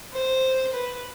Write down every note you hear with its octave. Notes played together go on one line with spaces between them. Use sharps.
C5
B4